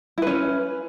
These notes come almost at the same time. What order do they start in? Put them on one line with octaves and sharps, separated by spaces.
E4 B4 C#4